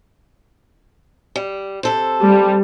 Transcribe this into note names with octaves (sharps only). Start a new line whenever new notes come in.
G3
C3 A4 C5
G3